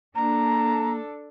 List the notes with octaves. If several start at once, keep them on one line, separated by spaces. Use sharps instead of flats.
A#3 D4 A4 A#5